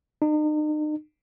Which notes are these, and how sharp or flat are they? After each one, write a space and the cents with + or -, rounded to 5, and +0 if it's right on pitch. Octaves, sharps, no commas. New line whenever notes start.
D#4 -40